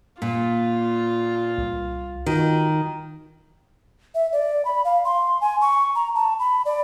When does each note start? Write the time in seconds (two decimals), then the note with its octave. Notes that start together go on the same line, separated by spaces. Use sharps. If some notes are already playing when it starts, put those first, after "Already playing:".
0.22 A#2 F4
1.58 C2
2.26 D#3 F4 F#4
4.15 E5
4.33 D5
4.65 B5
4.85 F5
5.05 C6
5.41 G#5
5.61 C#6
5.95 A#5
6.15 A5
6.39 B5
6.66 D5